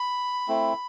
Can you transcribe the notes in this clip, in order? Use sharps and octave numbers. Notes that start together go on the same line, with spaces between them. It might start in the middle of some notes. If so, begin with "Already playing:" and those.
Already playing: B5
A3 C4 E4